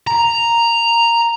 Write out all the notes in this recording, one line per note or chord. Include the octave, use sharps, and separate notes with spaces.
A#5